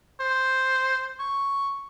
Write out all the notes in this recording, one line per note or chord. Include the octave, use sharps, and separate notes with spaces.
C5
C#6